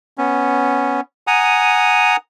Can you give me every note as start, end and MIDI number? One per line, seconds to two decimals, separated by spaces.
0.18 1.01 59
0.18 1.01 61
1.27 2.17 78
1.27 2.17 80
1.27 2.17 82
1.27 2.17 87